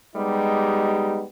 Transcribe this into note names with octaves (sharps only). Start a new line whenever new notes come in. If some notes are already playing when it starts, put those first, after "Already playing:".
G3 G#3 B3 D#4 G4